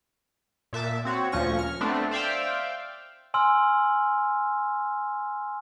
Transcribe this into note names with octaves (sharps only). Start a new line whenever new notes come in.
A#2 E5 A5 D6
C4 F#4 C#5
D2 A#2 F3 C#4 C#6 A#6
F6
A3 B3 C4 D4
C5 D5 E5 F5 G5
G#5 C6 E6 F6